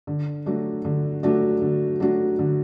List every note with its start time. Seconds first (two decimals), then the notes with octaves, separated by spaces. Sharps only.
0.07 D3
0.46 F#3 A3 D4 F#4
0.85 D3
1.23 F#3 A3 D4 F#4
1.62 D3
2.00 F#3 A3 D4 F#4
2.39 D3